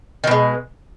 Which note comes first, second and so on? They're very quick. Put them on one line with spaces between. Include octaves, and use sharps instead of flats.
D#3 B2 G#3